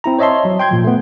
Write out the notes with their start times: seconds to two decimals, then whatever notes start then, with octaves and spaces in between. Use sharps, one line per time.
0.04 C4 E4 A#5
0.18 C5 C#5 D#5 E5 A5 C6
0.45 F#3
0.59 G5 C6 G6 G#6
0.71 A#2 F3
0.84 A3 B3